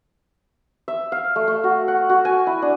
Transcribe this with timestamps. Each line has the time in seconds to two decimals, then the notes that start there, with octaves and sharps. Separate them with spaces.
0.88 E5
1.12 F5
1.36 A3
1.48 A3
1.64 F#4
1.88 F#5
2.09 F#4
2.25 G#5
2.47 E4
2.62 D4